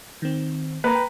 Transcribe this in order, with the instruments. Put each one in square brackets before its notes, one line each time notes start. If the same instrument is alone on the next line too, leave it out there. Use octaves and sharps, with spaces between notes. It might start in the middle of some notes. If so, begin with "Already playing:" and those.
[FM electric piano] D#3 C4
[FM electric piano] A#3 [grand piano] B4 A#5
[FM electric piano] G5